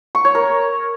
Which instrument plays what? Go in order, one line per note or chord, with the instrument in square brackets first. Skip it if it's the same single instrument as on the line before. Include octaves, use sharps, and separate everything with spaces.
[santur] C#6
C#5
A#4